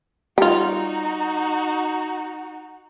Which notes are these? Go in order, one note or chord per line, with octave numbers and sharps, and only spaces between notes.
G3 D#4 F4 F#4